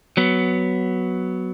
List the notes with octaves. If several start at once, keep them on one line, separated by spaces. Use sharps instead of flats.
F#3 B3